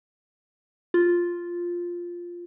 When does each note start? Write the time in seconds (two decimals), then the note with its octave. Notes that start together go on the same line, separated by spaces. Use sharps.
0.94 F4